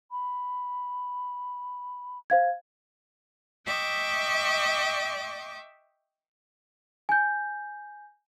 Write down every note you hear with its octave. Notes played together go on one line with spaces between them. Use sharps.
B5
C5 F5 G#6
D#5 E5 G5 C#6 D6
G#5 G6